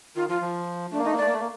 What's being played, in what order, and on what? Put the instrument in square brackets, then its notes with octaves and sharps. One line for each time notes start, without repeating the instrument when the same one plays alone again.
[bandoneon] D#3 [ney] F4
[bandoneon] F3 [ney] F4
[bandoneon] F3
[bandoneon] A3 [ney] D4
[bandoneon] A#3
[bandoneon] A3 [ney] D#4
[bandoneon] A#3
[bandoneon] A3 [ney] D5
[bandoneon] A#3
A3
A#3